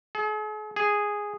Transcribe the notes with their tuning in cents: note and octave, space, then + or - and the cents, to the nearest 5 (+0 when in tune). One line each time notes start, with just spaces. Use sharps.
G#4 +45
G#4 -5